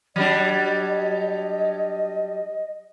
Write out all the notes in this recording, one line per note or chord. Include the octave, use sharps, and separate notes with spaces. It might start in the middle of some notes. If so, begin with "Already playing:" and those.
F#3 G3 D4 D#5